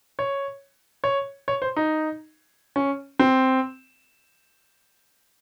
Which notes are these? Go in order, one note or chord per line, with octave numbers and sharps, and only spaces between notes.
C#5
C#5
C#5
C5
D#4
C#4
C4